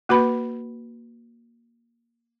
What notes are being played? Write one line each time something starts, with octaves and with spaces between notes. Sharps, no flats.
A#3 F#4 B4 B5